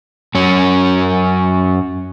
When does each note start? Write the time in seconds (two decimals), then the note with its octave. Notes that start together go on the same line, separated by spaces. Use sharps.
0.35 F#2 C#4